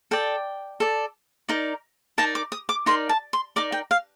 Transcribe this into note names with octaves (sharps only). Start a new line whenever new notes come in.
A4 D5 G5
A4 D5
D#4 A#4 D5
D#4 A#4 D5 A5
D6
D#6
D6
D#4 A#4 D5 C6
A5
C6
D#4 A#4 D5 D6
G5
F5